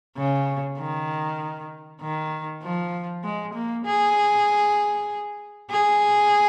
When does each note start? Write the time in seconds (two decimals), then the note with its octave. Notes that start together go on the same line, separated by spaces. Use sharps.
0.17 C#3
0.78 D#3
2.01 D#3
2.63 F3
3.24 G#3
3.54 A#3
3.86 G#4
5.70 G#4